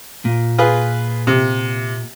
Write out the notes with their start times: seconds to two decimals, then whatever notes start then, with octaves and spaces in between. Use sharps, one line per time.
0.25 A#2
0.58 F4 G#4 B4
1.27 C3